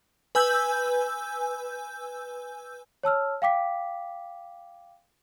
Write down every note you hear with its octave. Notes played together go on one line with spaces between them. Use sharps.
B4 G#5 E6 G6
C#5 A5 E6 F6
F5 G5 D6 B6